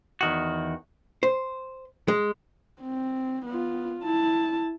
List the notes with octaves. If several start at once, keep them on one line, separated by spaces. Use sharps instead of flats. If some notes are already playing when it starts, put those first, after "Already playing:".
E2 D#3 F#4
C5
G#3
C4
B3 F4
E4 A5